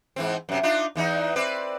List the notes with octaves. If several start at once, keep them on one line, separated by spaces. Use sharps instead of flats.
G#2 E3 C4
F#2 C3
D4 D#4 F4
E2 E3 D#4
C4 B4 D5